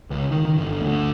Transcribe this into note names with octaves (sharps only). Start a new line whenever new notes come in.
C#2
D#3
D#3
G1
D2